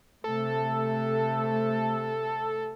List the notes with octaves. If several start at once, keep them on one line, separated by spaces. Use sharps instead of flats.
C3 A3 A4